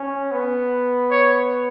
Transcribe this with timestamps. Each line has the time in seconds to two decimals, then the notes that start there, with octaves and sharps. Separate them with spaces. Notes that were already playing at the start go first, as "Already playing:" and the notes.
Already playing: C#4
0.31 B3
1.11 C#5